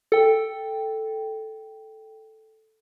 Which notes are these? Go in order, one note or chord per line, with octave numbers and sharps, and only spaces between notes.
A4 G5